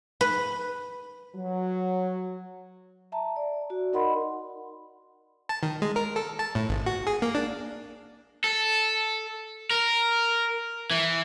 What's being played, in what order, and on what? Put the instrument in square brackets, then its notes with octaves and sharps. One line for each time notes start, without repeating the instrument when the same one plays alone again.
[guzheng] B4
[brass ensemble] F#3
[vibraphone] E5 A5 A#5
D5
F#4 D5
D#4 A#4 D#5 F#5 B5 C6
[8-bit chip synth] A5
D#3
G#3
A#4
A4
A5
A2
G#1
F#4
G#4
A#3
D4
[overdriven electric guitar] A4
A#4
E3